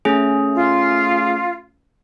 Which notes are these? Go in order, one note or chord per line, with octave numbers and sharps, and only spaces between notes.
A3 C#4 G#4
F4